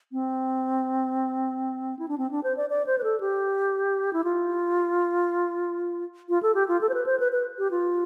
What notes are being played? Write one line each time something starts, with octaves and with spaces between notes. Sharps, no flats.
C4
E4
D4
C4
D4
C5
D5
D5
C5
B4
A4
G4
E4
F4
F4
A4
G4
F4
A4
C5
B4
C5
B4
B4
G4
F4